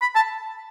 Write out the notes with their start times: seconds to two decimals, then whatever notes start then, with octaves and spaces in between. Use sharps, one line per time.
0.02 B5
0.16 A5